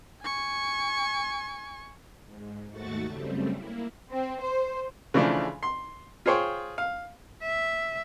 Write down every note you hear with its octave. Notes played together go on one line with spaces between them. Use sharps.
G#5 C#6
G#2
D#2 G#2 A3 F#4 C#6 A6
F#2 C#3 G3 A3 C4
A#3 E4
C4
C5
C#3 E3 F3 A3 D4
C6
F4 G#4 C5 C#5 G5
F5
E5